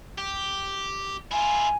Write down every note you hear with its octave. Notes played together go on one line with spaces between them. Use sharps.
G4
E4 F4 G#5